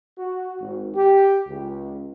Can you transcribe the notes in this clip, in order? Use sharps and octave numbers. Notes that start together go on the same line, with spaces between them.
F#4
G#1
G4
C#2